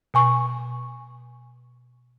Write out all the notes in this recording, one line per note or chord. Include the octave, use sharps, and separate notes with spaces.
B2 G#5 C#6